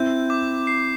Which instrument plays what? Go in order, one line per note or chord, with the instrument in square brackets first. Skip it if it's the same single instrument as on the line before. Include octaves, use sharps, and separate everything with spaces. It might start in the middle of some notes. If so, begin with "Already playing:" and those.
Already playing: [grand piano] C4 E4 [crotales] G6
[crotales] D6
C7